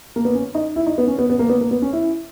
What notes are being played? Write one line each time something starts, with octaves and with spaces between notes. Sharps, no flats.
A#3
B3
C#4
D#4
E4
D#4
B3
C#4
B3
B3
A#3
B3
A#3
B3
C#4
E4